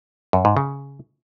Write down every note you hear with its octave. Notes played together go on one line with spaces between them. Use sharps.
F#2
G#2
C#3